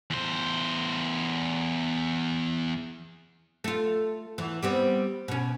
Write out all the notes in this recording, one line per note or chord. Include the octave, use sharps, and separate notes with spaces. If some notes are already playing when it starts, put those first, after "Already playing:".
E2 C5
A3 F4
E2 E3
G3 B3 C4
B2 C#4